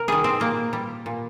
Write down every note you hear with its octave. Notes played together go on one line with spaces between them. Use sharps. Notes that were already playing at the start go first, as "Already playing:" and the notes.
Already playing: C3 A#4
D#3 G3 G#4
C4
A#2 A#3
G3
A#2